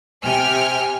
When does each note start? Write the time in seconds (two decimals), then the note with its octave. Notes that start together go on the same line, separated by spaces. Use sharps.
0.24 C3 G5 G#5 F6